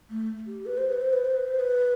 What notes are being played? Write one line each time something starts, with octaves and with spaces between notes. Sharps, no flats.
A3
G4
B4
C5
B4
C5
B4
C5
B4
C5
B4